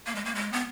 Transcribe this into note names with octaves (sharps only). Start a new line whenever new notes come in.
A#3
G#3
A#3
G#3
B3